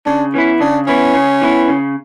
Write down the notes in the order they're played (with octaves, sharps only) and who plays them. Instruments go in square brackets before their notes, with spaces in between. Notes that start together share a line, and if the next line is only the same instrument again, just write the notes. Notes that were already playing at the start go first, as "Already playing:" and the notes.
[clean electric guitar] C#3 [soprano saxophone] D4
[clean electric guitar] E3 B3 E4 [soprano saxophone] C#4
[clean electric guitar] C#3 [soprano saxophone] D4
[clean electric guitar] E3 B3 E4 [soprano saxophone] C#4
[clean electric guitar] C#3
E3 B3 E4
C#3